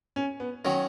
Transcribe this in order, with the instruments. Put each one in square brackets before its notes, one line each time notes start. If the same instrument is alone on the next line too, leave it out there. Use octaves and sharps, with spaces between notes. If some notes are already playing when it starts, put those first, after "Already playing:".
[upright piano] C#4
B3
[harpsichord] D#3 F#3 [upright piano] C#4